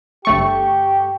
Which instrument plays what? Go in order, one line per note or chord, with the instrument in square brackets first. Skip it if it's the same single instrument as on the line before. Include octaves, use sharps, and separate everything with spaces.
[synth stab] G1 A3 C#6 [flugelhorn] G4